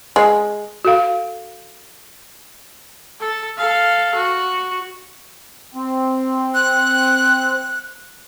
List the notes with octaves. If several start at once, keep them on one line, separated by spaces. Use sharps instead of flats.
G#3
F#4 A4 F5
A4
A4 F5
F#4
C4
F#6